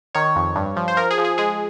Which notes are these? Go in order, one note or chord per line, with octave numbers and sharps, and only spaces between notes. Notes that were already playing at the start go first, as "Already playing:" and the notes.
D#3 C#5
F2
G2
F3
C5
F3 A#4
G#4
F3
G#4
G#3 G#4